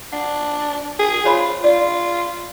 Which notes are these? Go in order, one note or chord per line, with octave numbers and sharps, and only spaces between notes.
D4 F#5
G#4
F4 C5 C#5 B5
F4 D5